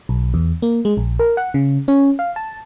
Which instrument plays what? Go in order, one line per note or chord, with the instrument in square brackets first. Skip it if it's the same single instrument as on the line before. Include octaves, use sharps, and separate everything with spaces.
[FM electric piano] B1
E2
A#3
G#3
A#1
A#4
F#5
C#3
C#4
F5
A5